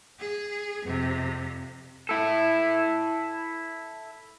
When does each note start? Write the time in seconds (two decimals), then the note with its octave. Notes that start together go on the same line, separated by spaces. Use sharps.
0.20 G#4
0.84 F2 C3
2.09 E4 A4